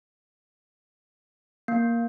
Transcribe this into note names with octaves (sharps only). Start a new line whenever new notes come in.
A#3